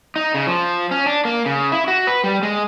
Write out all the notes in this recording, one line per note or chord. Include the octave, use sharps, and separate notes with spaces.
D#4
C#3
F3
C#4
D4
A#3
C#3
E4
F#4
B4
G3
G#3